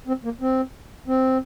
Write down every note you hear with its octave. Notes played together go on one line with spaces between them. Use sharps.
C4
A#3
C4
C4